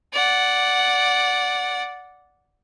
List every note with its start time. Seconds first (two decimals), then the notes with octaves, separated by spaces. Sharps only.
0.13 D5 F#5